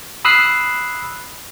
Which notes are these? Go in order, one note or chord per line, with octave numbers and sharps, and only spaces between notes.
B5 D#6 E6 F#6 C7